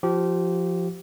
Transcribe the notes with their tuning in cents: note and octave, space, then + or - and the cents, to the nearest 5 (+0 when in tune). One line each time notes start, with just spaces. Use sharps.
F3 +0 G4 -25